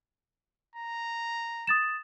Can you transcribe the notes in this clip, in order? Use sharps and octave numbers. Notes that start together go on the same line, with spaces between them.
A#5
D#6 A6 E7